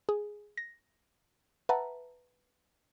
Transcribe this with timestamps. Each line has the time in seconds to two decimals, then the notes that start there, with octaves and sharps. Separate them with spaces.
0.09 G#4
0.57 A#6
1.69 B4 E5 F#5 A5 A#5